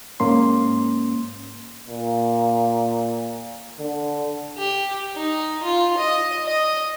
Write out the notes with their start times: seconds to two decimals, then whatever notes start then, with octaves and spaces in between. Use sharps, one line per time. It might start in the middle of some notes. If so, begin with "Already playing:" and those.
0.20 G#2 A#3 C#4 C6
1.88 A#2
3.79 D3
4.57 G4
5.16 D#4
5.63 F4
5.97 D#5
6.46 D#5